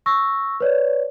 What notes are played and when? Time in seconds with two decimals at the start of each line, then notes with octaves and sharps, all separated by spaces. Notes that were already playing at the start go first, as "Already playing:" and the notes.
0.06 C#6 E6 A#6
0.60 B4 C#5 D5